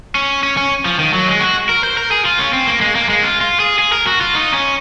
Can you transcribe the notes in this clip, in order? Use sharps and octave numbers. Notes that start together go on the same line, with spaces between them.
C#4
C#4
C#4
F3
D#3
F#3
G#3
F#4
A#4
C5
A#4
G#4
F4
C#4
C4
A#3
G#3
A#3
G#3
F4
F4
G#4
G#4
A#4
F#4
F4
D#4
C#4